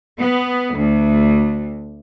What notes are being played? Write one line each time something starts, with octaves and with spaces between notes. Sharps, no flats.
B3
D2